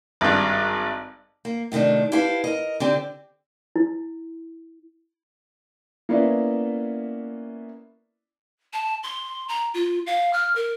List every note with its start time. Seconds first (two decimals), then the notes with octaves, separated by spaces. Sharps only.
0.21 G#1 G2
1.45 A#3
1.72 A2 C3 D#3 A3 D4
2.12 E4 G4 B4 C5 F5 A5
2.44 A#4 D#5
2.80 D3 C4 G4
3.76 E4
6.09 A#3 B3 C#4 E4 D5 E5
8.73 A5
9.03 C6
9.49 A#5
9.74 F4
10.07 F5
10.33 F6
10.56 A#4